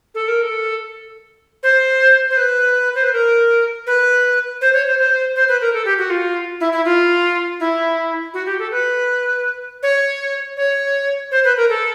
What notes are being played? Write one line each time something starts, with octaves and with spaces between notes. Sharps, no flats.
A4
A#4
A4
C5
C5
B4
C5
B4
A#4
B4
C5
C#5
C5
C5
C5
B4
A#4
A4
G4
F#4
F4
E4
E4
F4
E4
F#4
G4
A4
B4
C#5
C#5
C5
B4
A#4
A4